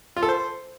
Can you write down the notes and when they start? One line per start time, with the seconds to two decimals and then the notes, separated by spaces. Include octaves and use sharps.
0.16 F4
0.23 A4
0.29 C5